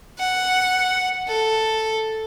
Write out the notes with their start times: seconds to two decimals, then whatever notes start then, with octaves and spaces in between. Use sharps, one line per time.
0.19 F#5
1.28 A4